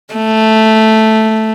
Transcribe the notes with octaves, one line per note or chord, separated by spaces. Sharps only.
A3